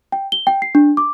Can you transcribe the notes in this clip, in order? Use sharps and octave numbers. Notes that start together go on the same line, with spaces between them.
G5
G7
G5
C7
D4
D6